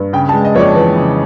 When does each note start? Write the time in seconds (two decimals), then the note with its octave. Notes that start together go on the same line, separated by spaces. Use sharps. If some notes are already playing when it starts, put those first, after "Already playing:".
Already playing: G2
0.13 C#3 G5
0.29 A5
0.33 G#3
0.45 D#5
0.55 F2 C#5
0.59 D5
0.75 E3
0.96 C#3